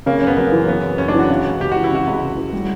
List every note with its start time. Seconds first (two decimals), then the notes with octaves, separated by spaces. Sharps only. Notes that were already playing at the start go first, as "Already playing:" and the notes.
0.06 C#3 A#3
0.22 F#2
0.27 B3
0.37 F#2 A#3
0.52 E3
0.68 C#3 B3
0.83 F#2
0.98 F#2 C#4
1.08 D4
1.15 E3 F#4
1.30 C#3
1.45 C#2
1.60 C#2 G4
1.72 E3 F#4
1.84 E4
1.91 C#3 F#4
2.07 C#2
2.22 C#2
2.37 E3
2.53 G3